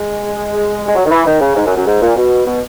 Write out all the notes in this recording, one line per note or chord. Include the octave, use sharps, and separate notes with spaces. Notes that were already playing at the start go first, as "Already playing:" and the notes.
Already playing: G#3
G#3
F#3
D#3
E3
D#3
C#3
G#2
F#2
F#2
G#2
A#2
B2
B2